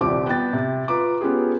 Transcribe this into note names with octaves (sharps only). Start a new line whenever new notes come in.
D#1 C2 C4 G4 D5 D6
B3 B4 G5 A6
C3
F4 B4 A#5 D6
B3 C#4 F4 G4 G#4